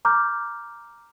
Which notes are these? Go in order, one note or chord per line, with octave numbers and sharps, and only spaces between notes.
A#5 D6 F6 G6